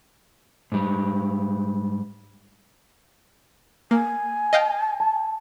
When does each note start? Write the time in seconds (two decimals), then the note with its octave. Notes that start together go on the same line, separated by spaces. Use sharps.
0.72 G#2 G3
3.91 A#3 G#5
4.53 D#5 F5 G5
5.00 A5